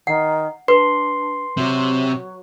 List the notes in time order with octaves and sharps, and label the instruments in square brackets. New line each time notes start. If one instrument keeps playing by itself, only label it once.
[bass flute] D#3 [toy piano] F#5
[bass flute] D4 [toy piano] B4 [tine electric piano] C6
[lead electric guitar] C3 [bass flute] F#3